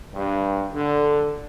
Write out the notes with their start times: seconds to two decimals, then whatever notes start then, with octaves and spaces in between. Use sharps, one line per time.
0.14 G2
0.73 D3